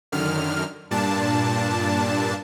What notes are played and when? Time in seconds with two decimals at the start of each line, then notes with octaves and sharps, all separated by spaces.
0.12 F#2 D3 D#3 F6
0.91 G2 A#2 D4 A5